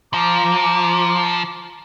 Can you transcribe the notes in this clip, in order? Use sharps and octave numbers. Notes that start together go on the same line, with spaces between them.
F3 A#5 D6